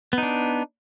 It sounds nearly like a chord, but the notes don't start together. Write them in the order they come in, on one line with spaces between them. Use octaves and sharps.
B3 D#4 D4